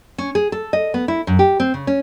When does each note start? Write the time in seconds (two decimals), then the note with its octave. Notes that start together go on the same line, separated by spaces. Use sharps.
0.18 C#4
0.35 G#4
0.52 A4
0.73 D#5
0.94 B3
1.08 E4
1.27 F#2
1.39 G4
1.60 C4
1.74 C#3
1.87 C#4